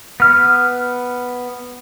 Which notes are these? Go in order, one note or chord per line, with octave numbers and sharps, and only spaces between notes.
B3 F6